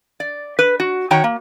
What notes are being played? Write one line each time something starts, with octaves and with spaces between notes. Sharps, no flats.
D5
B4
F#4
D#3 F#4 C#5 G5 A#5
A#3